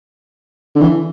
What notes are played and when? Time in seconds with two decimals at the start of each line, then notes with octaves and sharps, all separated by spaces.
0.75 D3
0.81 E3